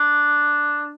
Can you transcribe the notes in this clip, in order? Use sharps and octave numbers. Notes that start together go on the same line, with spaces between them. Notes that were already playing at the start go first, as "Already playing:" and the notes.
Already playing: D4